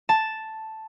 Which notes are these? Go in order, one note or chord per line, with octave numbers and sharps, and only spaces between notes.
A5